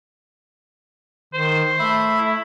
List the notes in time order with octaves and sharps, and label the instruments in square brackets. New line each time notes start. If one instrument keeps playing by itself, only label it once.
[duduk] D#3 [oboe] C5
[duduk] A3 [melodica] E5 B5
[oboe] E4